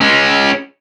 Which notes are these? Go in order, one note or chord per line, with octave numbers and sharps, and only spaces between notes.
G#3 C#4